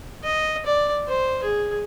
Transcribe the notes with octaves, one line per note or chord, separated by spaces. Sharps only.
D#5
D5
C5
G#4